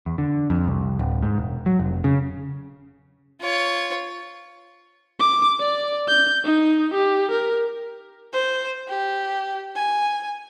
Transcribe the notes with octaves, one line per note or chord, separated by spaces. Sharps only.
E2
D3
F2
C2
D1
G#2
E1
F#3
F1
C#3
F4 C#5
D6
D5
G6
D#4
G4
A#4
C5
G4
G#5